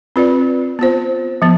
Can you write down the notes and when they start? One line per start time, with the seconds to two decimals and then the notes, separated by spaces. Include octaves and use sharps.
0.16 C4 F4 B4 D5
0.79 B3 F4 C5
1.42 F3 B3